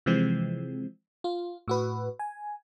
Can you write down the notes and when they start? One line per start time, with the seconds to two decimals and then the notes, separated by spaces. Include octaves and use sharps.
0.06 C3 E3 F3 G#3 C4
1.24 F4
1.68 A2 F#4 B4
2.19 G#5